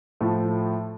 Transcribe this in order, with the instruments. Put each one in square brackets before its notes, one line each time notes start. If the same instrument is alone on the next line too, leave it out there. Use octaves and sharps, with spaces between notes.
[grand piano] A2 F3 A3